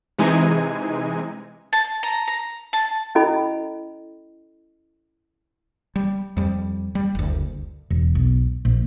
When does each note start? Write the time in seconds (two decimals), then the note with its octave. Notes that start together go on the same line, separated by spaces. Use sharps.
0.19 C3 E3 G#3 D#4 G#5
1.73 A5
2.03 A#5
2.28 A#5
2.73 A5
3.15 C#4 E4 A4 D#5 B5
5.96 G3
6.37 F2 G3
6.95 G3
7.15 F#1 D2
7.90 E1
8.15 B1
8.65 A#1